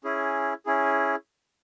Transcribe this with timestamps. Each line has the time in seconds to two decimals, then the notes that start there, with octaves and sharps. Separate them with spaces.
0.04 C#4 E4 G#4
0.66 C#4 E4 G#4